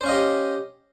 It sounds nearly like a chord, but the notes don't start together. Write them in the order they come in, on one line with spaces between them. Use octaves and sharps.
C5 C#4 F5 D#5 G4